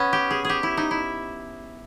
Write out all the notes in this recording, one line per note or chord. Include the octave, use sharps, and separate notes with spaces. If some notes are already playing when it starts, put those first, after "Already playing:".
Already playing: B3 C#4
G4
G#4
G4 G#4
E4
D#4
E4